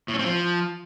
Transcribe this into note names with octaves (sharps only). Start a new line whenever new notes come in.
A2
C#4
C4
F3